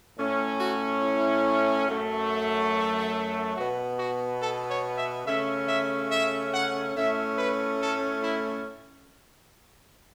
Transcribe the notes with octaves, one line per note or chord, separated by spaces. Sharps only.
A2 A3 C#4
F#4
E4
F#2 F#3 A3
B2 B3 F#4
F#4
A4
C#5
E5
C#3 A3 C#4 E5
E5
E5
F#5
A2 A3 C#4 E5
B4
A4
E4